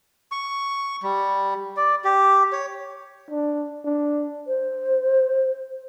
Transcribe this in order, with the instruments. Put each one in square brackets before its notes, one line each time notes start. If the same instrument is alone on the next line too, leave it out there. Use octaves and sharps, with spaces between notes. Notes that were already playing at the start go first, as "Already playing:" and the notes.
[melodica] C#6
G3
D5
G4
C#5
[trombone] D4
D4
[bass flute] C5